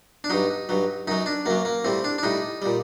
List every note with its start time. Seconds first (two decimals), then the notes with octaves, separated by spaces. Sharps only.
0.24 D4
0.30 G2 F#3 D#4
0.69 G2 F#3
1.07 F#2 F#3 D#4
1.26 D4
1.46 F#2 F#3 A#3
1.65 A#3
1.84 A2 G3 C4
2.04 D4
2.18 D4
2.23 A2 G3 D#4
2.62 A#2 G3